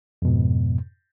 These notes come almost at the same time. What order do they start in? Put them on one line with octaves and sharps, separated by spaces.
F2 B2 G#2